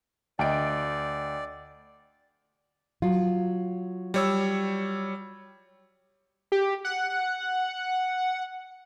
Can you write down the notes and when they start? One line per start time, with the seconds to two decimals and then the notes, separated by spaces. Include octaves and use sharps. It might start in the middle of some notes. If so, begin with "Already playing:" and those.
0.39 D2 D5 D#5 G5 D7
3.02 F#3 F4
4.14 G3 C#5 E6
6.52 G4
6.85 F#5